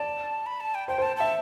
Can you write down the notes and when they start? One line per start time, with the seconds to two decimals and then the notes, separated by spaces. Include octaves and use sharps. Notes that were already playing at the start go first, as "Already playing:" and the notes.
Already playing: D5 A5
0.46 B5
0.60 A5
0.75 G5
0.88 C5 G5
0.98 C5
1.02 A5
1.17 E5 A5